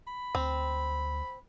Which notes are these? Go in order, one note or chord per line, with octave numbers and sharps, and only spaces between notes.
B5
D2 C4